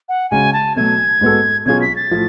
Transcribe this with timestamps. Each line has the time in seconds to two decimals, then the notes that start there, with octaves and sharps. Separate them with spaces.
0.09 F#5
0.31 C#3 G#3 C#4 F#4 G#5
0.53 A5
0.76 B2 F#3 A3 G#6
1.21 G#2 G#3 B3 F#4 A4
1.66 B2 F#3 C#4 F4 G#4 G#6
1.82 B6
1.96 A6
2.11 A2 F3 A3